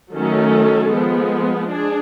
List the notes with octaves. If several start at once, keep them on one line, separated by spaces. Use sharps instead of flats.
D#3 F#3 A3 C#4 A4
F3 G#3 B3
D4 G#4